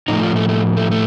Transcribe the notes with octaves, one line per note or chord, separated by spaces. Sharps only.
A2 F3 A3 D#4
F4
A3
A3
A3
A3